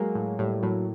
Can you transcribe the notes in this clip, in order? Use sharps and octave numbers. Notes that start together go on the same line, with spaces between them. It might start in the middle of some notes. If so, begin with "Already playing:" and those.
Already playing: F#3 G#3 A#3
A2
A2 G3
A2 F#3